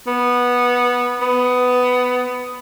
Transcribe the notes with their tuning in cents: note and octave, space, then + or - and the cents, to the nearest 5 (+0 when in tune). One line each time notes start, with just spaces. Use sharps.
B3 -10
B3 +15